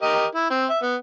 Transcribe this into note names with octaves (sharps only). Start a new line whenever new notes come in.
G4 A#4 D#5
E4
C4
E5
B3